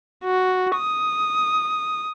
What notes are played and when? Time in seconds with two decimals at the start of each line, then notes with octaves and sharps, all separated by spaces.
0.24 F#4
0.77 D#6